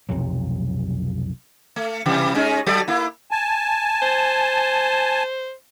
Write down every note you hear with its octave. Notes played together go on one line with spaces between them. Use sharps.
B1 F2 C3 F#3
A3
C3 E3 G3
G#3 C#4 D#4
F#3 A4 D5
A#3 E4
G#5 A5
C5